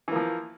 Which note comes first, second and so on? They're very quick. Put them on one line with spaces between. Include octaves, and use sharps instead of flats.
E3 A#3 F3